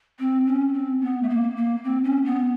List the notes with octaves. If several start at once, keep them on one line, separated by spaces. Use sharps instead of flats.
C4
C#4
C4
B3
A3
A#3
A#3
C4
C#4
B3